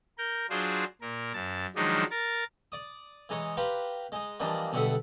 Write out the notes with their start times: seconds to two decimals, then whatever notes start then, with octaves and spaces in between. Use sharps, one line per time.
0.18 A#4 G6
0.50 F#3 D4 F4 G#4 C5
1.01 A#2 A#4
1.34 F#2 A5
1.76 D#3 F3 F#3 G#3 D4 D#4
2.11 A#4 A6
2.72 D5 D#6
3.29 E3 G#3 D#4 C#5
3.57 G4 B4 F5 A#5 C6
4.12 G#3 D#4
4.40 E3 F3 G3 A#3 D4 D#4
4.72 B1 B2 D3 G3 E5 F#5